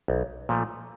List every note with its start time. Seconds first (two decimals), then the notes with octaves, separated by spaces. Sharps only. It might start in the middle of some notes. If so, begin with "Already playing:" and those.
0.08 B1
0.49 A#2 F3 A3